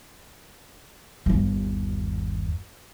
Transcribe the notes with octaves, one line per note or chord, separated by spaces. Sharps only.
G1 D#2